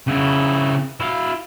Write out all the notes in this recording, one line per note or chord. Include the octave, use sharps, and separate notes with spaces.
C#3 E4
E4 F5